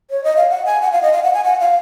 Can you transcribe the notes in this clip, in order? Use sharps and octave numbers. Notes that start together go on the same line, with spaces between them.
C#5
D#5
F5
F#5
G#5
F#5
F5
D#5
F5
F#5
G#5
F#5
F5